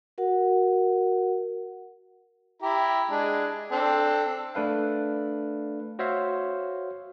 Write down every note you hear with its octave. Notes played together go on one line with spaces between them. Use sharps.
F#4 A#4 F#5
E4 G4 A#5
G#3 D4
C4 D4 A4
A3 D4 B4 F5
F#4 C5 C#5 E5 F5